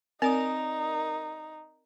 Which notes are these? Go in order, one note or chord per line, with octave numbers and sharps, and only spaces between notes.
C4 D#4 A#4 D5 D#6